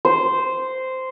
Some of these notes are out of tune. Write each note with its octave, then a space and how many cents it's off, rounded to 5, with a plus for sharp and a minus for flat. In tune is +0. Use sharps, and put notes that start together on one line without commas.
C5 -10